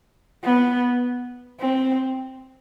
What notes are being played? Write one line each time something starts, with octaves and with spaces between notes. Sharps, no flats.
B3
C4